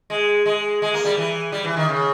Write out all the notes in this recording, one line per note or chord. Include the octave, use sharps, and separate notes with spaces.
G#3
G#3
G#3
A#3
G3
E3
G3
E3
D#3
C#3